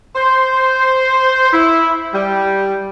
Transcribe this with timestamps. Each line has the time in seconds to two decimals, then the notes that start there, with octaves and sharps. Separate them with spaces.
0.16 C5
1.51 E4
2.13 G3